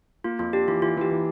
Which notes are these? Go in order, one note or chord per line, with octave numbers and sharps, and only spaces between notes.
A#3 F4
F2 F4
D4 G4
E3 F4
E3 F4
E3 G4
E3